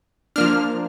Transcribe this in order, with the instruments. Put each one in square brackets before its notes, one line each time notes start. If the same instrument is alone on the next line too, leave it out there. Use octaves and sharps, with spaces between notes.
[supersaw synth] F3 A#3 D4 F6